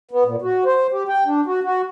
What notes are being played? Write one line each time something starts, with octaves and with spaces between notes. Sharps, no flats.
B3
A#2
F#4
C5
G4
G5
D4
F#4
F#4